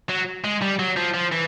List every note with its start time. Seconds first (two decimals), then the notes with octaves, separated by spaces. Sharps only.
0.09 F#3
0.44 G#3
0.62 G3
0.79 F#3
0.96 F3
1.14 F3
1.32 E3